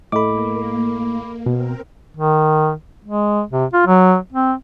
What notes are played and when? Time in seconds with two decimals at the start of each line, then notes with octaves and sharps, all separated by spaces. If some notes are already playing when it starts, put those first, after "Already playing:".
0.12 A2 A#3 A4 D#5 B5 D6
1.46 B2 C4 A#4
2.17 D#3
3.05 G#3
3.52 C3
3.74 F4
3.87 F#3
4.33 C4